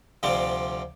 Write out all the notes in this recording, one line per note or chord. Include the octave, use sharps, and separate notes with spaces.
D2 C3 F3 G3 C4